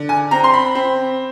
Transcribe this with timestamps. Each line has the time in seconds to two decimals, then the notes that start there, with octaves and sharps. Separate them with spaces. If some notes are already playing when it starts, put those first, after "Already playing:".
Already playing: D3
0.09 G#5
0.31 C4 A#5
0.44 C6
0.54 B5
0.75 C4